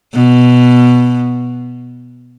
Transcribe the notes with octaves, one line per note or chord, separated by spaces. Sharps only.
B2